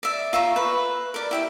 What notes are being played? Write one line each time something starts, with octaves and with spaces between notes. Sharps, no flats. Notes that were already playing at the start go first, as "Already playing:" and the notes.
D5 E5
F4 E5 A#5 C#6
B4
A#4 D5
E4 G4 E5